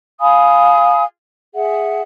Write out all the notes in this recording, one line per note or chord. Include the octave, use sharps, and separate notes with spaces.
F5 G#5 B5 D#6
G#4 E5 F#5